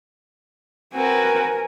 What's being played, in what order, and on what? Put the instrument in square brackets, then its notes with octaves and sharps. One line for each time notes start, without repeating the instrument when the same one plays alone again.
[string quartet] C4 F#4 B4 [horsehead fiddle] A#4 G#5